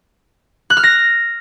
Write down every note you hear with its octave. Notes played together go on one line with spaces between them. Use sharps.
F#6
F6
A#6